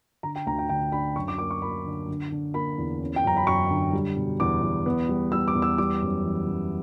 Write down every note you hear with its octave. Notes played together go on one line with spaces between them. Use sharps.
D3 A#5
G5
D2 A#5
G5
D3 G5
D4 B5
F#2 C#6
D6
A#3 D6
C#6
A#3 B5
D3
D3
D3
A#3 B5
E2
C#4
G5
F#2 A#5
B5
F#2 C#6
D3
G3
B2
E2 D6
E2
B3
G3
G3 E6
D6
E2
E6
G3 D6
F#2
E3
F#2